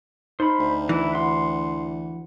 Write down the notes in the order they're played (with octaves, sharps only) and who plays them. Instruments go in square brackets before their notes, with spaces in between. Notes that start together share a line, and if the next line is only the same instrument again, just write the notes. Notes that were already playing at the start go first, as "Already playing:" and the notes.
[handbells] D#4 [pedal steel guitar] C5 B5
[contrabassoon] D2
[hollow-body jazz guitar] E3 [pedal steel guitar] E4 F#6
[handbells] E4 F#5 [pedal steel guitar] C6